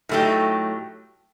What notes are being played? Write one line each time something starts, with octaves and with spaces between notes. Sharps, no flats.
A2 F#3 A3 D#4 G4